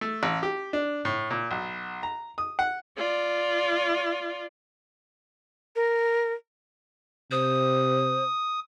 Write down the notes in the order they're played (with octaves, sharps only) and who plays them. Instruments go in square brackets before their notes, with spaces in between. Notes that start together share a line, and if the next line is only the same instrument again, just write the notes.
[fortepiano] A3
A1
G4
D4
A2
A#2
B1
A#5
D#6
F#5
[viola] F4 D5
[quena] A#4
[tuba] C3 [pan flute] C5 [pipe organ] D#6